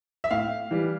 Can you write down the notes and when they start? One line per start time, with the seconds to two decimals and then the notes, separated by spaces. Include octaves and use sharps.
0.24 E5
0.31 A2 F5
0.71 E3 G3